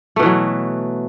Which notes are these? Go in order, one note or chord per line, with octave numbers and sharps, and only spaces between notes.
B2 E3 F#3 A3